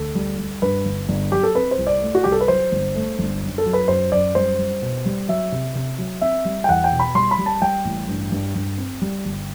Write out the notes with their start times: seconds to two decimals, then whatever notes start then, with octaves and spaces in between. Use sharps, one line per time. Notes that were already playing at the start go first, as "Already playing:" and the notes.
Already playing: D2 A4
0.15 G3
0.38 G3
0.62 G2 B4
0.85 G1
1.09 G1
1.32 F#3 G4
1.43 A4
1.55 C4 B4
1.71 C5
1.78 C2
1.87 D5
2.02 A3
2.15 F#4
2.24 C2 G4
2.32 A4
2.41 B4
2.48 F#3 C5
2.72 G1
2.95 A3
3.19 G1
3.42 F#2
3.58 A4
3.66 F#3
3.73 B4
3.88 F#2 C5
4.11 F#2 D5
4.35 G3 C5
4.58 G3
4.82 B2
5.06 G3
5.28 F#3 E5
5.52 C3
5.75 C3
5.98 F#3
6.21 C4 E5
6.45 G3
6.64 G5
6.69 E2 F#5
6.84 G5
6.92 B2
7.00 B5
7.15 G3 C6
7.31 B5
7.39 G3
7.46 A5
7.62 G3 G5
7.85 A1
8.09 G2
8.32 G2
8.55 G2
8.78 C4
9.02 G3
9.25 G1